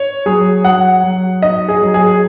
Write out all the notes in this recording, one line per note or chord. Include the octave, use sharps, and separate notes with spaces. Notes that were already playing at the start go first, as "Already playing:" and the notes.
Already playing: C#5
F#3 G#4
F#3 F#5
F#3
D#4 D#5
G#4
F#3
G#4